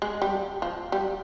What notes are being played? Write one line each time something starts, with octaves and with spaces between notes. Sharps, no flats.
G#3
G3
F3
G3